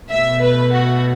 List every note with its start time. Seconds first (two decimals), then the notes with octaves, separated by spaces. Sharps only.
0.10 B2 A3 E5
0.42 B4
0.72 F#4